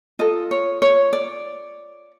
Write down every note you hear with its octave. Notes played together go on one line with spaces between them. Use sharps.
F4 A4 D#5
C#5
C#5
D5